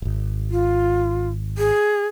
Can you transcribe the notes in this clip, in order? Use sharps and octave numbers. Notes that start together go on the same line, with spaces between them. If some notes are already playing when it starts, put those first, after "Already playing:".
D#1 G#1
F4
G#4